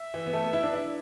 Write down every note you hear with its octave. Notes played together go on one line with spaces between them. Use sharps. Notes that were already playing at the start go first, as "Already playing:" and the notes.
Already playing: E5
E3
B3
A3
B3
E4
D4
E4